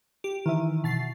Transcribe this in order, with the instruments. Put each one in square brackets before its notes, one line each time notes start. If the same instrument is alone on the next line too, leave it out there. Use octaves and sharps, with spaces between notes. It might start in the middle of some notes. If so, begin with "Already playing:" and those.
[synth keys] G4
[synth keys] D#3 [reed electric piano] E3 E4 E5
[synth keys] B2 A6 C7